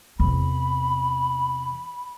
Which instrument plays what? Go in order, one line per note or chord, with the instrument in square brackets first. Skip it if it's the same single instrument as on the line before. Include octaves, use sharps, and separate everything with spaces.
[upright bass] E2 C3 [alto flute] B5